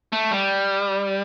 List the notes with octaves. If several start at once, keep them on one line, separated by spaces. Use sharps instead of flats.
A3
G3